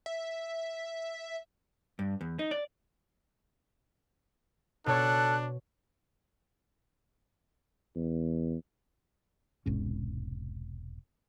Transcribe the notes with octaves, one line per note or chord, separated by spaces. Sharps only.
E5
G2
E2
D#4
D5
B2 D4 A4 C#5 F#6
E2
E1 C2 G#2 C#4